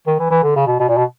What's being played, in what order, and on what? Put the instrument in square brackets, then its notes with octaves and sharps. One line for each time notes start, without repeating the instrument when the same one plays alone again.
[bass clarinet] D#3
E3
E3
D3
C#3
B2
B2
A#2
B2